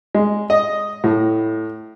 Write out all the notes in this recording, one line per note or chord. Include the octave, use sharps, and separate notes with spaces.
G#3
D#5
A2